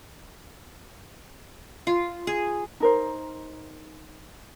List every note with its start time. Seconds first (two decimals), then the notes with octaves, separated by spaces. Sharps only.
1.87 F4
2.27 G#4
2.80 D#4 A#4 C5